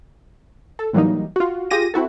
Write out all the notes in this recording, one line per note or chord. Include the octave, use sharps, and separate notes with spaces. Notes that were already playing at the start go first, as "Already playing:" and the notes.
A4
A2 E3 F#3 G3 A#3 D#4
F4 F#4
F4 G4 G#4 A#6 D#7
C4 E4 F#4 A4